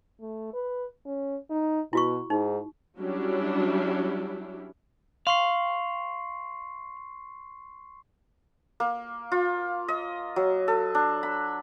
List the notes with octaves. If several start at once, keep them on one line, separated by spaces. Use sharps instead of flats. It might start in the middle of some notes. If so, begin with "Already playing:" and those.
A3
B4
C#4
D#4
B2 E4 F#4 C#6
G#2 D#4
F#3 G3 C#4 D4 E4 G4
F5 C6 C#6 C7
A#3
F4
D#5
F#3
A4
D4
B5